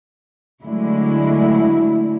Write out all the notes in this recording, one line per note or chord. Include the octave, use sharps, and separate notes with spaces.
D3 F#3 G#3 A3 E4